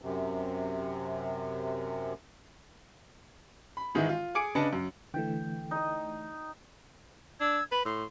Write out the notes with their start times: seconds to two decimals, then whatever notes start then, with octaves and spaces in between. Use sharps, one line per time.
0.02 F#2 C3
3.77 B5
3.95 G#2 D#3 E3 G#3 D#4 E4
4.09 F4
4.35 G#4 G#5 D6 C#7 D7
4.55 C#3 D4 B4 D#5 A5 C#7
4.73 F#2
5.14 D3 E3 A3 G5
5.71 D#4 D#5
7.40 D4 E6 G#6
7.72 B4 B5
7.85 A2 C6